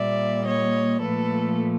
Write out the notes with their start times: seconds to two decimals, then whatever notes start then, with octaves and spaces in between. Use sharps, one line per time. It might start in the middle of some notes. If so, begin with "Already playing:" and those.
Already playing: A#2 G3 A#3 D5 E5
0.45 C#5 D#5
1.00 A#2 F3 A3 A4 B4